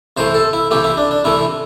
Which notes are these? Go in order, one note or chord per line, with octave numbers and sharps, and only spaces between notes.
C3 E3 A3 C5
A4
E4
C3 E3 A3 G4
E4
D4
D4
C3 E3 A3 E4